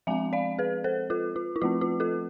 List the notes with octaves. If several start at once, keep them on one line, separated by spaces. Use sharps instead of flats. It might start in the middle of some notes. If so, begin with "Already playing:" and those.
F3 G#3 C4 E5 G#5
D5 F5
G#4 B4
A4 C5
F4 A4
F4
E4
F3 A3 C4 F4
F4
F4 A4